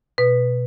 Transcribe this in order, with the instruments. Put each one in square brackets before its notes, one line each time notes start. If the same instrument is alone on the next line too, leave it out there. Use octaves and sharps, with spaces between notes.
[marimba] B2 B4